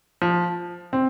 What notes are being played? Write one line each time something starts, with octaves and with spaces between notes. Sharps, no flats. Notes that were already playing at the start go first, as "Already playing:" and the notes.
F3
C4